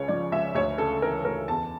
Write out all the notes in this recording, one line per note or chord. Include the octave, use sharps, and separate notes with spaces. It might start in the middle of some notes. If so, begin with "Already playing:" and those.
Already playing: C#2 C#3 C#5
F3 D5
C#2 E5
D2 C#5
C#3 A4
E3 A#4
D2 A#4
E2 A5